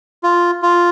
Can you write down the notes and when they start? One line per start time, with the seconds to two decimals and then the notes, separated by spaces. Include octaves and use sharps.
0.23 F4
0.63 F4